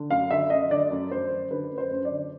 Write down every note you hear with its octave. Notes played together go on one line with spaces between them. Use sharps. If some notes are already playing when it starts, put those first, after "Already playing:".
Already playing: D3
F#2 F5
D3 E5
F#2 D#5
D3 D5
F#2
F#2 C5
F#2
D3 B4
F#2
C5
F#2
D5
D3